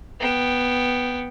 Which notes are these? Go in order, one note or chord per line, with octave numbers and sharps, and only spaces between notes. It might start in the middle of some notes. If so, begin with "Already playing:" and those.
B3 G5